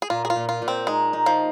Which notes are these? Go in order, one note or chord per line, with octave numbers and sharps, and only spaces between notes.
G#4
A#2 F4
G#4
F4
A#2
F4
A#2
C4
G#3 D#4
D#4
F3